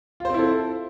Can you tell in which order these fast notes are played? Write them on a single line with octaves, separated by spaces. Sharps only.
F4 C5 C4 E4 A4